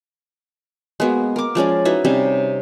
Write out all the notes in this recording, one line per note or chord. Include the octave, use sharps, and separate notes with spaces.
G#3 A#3 B3 F#4
A#4 D6
F3 G#3 C#4 D5
D#4 E4 F#4 B4
C3 G3 C#4 D#4